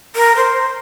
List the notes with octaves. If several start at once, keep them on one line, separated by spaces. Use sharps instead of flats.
A#4
C5